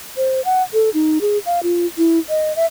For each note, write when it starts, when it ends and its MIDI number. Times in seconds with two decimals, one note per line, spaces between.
0.17 0.44 72
0.45 0.62 78
0.74 0.90 69
0.94 1.18 63
1.21 1.38 68
1.46 1.60 77
1.63 1.86 65
1.98 2.19 64
2.29 2.55 75
2.56 2.66 76